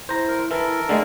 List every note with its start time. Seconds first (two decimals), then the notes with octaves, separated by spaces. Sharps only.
0.09 E4 C5 A#5
0.28 A#4
0.51 E3 A4 A#4
0.89 D3 G#3 A3